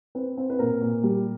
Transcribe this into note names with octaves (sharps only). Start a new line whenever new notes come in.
C4 B4
C4
B4
A#2 A#4
A#2
G3